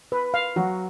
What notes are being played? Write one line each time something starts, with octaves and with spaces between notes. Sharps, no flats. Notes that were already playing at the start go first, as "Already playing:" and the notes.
B4
F5
F#3 F#4